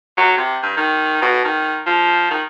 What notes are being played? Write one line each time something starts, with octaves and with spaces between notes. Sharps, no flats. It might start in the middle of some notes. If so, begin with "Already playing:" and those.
F#3
C3
G2
D#3
B2
D#3
F3
D#3